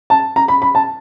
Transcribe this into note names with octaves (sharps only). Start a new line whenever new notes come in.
A5
A#5
B5
B5
A5